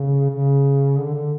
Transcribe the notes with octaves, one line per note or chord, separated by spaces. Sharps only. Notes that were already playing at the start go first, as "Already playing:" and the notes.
Already playing: C#3
C#3
D3
D3